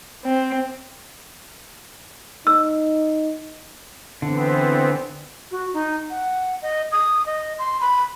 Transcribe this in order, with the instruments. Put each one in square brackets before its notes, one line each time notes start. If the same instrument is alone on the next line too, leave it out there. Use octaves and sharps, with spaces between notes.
[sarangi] C4
[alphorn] D#4 [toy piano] E6
[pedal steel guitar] D3 [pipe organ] E3 B3 C4
[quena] F#4
D#4
F#5
D#5
D#6
D#5
C6
B5